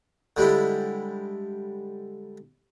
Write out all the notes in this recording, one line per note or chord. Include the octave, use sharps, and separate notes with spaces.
D3 G3 G#3 E4